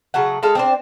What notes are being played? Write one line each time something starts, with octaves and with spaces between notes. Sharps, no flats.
C#3 F#3 A3 F#5
G#3 A4 F5
C4 D4 C5